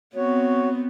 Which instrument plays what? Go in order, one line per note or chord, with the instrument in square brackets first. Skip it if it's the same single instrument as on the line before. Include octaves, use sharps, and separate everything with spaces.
[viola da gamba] B3 C4 [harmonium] F#4 C#5